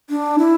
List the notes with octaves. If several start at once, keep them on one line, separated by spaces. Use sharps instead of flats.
D4
E4